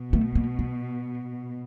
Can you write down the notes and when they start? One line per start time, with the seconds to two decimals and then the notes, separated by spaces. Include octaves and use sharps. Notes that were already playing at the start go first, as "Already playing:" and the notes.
Already playing: B2
0.13 A3
0.35 A#3
0.59 B3